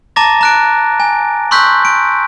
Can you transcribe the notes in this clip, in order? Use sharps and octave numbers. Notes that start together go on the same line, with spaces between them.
A5 A#5 D6 A6 A#6
A#5 F#6 D7
G#5
C6 C#6 E6 F#6 G6 B6
D7